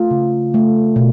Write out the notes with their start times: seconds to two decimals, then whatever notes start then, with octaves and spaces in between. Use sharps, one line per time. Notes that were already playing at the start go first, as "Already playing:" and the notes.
Already playing: A3 F4
0.11 C#3
0.54 A3
0.96 B2